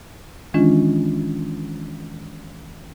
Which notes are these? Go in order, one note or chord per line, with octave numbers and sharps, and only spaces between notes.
D#3 E3 G#3 C#4 D4 F4